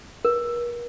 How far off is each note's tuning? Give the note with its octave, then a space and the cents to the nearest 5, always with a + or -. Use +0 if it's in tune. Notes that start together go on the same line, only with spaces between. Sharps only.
A#4 +40